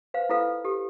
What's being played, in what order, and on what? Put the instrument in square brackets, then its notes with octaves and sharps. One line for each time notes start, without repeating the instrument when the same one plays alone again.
[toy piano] B4 C5 F5
E4 F4 A4 B4 F5
G4 A4